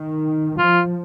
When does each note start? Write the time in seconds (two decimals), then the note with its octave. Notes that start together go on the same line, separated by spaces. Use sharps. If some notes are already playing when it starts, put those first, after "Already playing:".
Already playing: D#3
0.58 F3 F4